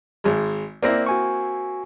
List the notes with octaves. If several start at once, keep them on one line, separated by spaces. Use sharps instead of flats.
G#1 G#3
A#3 C4 E4 D5 A#6
F#4 G#5 C#6